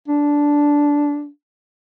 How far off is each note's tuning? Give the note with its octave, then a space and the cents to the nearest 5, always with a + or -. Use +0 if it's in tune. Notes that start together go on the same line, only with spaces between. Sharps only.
D4 -10